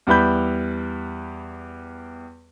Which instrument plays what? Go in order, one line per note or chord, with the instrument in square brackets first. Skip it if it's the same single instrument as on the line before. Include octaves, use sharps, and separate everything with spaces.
[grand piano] E2 G3 E4 B4 B5 G6